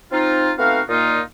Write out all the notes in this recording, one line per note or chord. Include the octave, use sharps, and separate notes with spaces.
C4 D#4 F4
A3 B3 C4 D#4 F#4 F5
A#2 A#3 D#4 F4